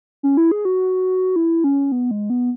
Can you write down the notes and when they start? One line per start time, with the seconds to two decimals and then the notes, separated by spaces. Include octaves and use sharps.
0.23 C#4
0.37 E4
0.51 G#4
0.65 F#4
1.36 E4
1.64 C#4
1.92 B3
2.11 G#3
2.30 B3